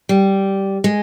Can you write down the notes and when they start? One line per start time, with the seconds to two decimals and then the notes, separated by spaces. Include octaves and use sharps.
0.09 G3
0.84 G#3